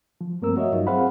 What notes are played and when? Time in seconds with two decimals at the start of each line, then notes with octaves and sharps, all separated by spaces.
0.21 F3
0.42 G2 A3 A#3 C4 A#4 E6
0.57 F#4 C#5 D#5 E5
0.72 G2 F#3 D#4 F4
0.87 C4 G#4 C5 F5 F#5 B5